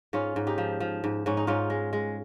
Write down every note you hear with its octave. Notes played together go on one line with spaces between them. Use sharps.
G#2 C#4 F4
G#2
D#4 G4
F3
F3
G#2
G#2 C#4
D#4
G#2 C#4 F4
G#3
G#3